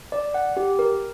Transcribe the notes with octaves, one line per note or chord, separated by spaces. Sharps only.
D5
F#5
G4
A#4